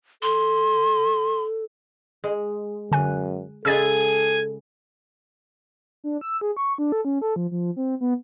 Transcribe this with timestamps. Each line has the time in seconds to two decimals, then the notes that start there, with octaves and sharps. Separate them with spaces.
0.23 A4 C6
2.24 G#3
2.92 F#2 D3 G#5 F#6
3.65 C#3 G#3 G#4 A4 G#5 E6 A6
6.04 D4
6.21 E6
6.41 G#4
6.57 C#6
6.78 D4
6.92 A4
7.05 C#4
7.21 A4
7.36 F3
7.51 F3
7.76 C4
8.01 B3